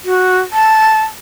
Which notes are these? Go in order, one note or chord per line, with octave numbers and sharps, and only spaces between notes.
F#4
A5